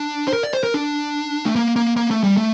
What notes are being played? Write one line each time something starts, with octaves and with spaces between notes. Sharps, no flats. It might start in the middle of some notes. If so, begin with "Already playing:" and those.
Already playing: D4
C5
A#4
D5
C5
A#4
D4
A3
A#3
A#3
A#3
A3
G3
A3